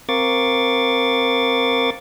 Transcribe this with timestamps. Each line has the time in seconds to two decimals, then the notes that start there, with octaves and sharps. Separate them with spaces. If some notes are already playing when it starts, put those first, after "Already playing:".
0.09 C4 A#4 F5 C#6 D6 A6